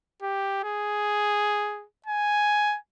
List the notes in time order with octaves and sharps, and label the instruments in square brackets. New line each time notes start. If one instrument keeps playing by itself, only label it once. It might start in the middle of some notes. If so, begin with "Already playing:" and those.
[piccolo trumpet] G4
G#4
G#5